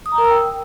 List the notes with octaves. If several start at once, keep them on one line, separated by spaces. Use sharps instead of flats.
D#6
A#5
A#4
E6
G5